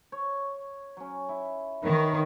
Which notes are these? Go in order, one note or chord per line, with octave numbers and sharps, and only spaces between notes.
C#5
F#3 C#4
E4
D#3 B4 C#5